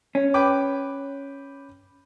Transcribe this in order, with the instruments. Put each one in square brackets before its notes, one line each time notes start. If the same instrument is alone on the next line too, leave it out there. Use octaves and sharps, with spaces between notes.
[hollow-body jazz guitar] C#4
[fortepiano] B4 G5 D6